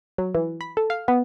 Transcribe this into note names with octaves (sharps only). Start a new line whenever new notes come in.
F#3
E3
B5
A4
F5
B3